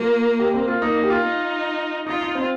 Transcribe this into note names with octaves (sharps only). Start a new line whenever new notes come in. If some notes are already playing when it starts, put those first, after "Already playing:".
Already playing: A#3 F4
G4
C4
F4
A#3 D#4
D#4
G4
F4
D#4
D#4 F4
D#4
C4